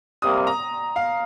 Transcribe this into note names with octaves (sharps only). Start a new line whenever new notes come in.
C3 G3 A#3 D#6
A#5
F5